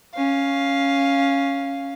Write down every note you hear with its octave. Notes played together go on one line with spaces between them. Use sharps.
C#4 F5